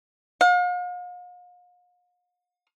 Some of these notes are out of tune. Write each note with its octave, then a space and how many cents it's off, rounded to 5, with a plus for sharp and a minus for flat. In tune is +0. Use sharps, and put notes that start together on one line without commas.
F5 +45